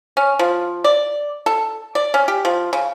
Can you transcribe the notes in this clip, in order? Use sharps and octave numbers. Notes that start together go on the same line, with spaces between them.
C#4
F3
D5
A4
D5
C#4
G4
F3
C#3